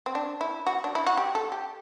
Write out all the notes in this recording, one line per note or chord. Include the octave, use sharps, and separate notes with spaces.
C4
D4
E4
F#4
D4
E4
F#4
G4
A4
G4